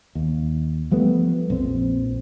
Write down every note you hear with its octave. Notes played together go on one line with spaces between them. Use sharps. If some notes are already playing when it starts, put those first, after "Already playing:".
D#2
F3 G3 A3 B3
A#1 F2 C4